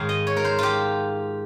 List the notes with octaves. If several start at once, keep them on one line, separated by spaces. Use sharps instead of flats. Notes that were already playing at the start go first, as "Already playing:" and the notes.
Already playing: G#2 D#3 A#4 C#5 F5
D#5
C#5
A#4
C5
F4 G4